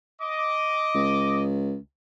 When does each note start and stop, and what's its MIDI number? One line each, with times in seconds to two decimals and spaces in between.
0.22 1.44 75
0.22 1.44 86
0.95 1.77 37